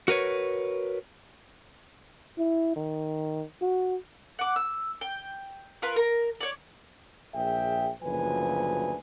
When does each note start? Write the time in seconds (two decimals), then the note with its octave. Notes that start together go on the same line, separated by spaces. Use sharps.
0.08 F#4 A#4 B4 C#5
2.39 E4
2.76 D#3
3.62 F#4
4.39 F#5 D6
4.56 E6
5.01 G5
5.82 F4 A#4 B4
5.96 A#4
6.41 C#5 D5
7.35 A#1 G#4 E5 G5
8.03 F#1 D2 F3 B4 G#5